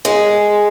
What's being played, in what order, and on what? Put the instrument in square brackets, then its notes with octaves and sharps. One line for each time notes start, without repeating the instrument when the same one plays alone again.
[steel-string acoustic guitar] G#3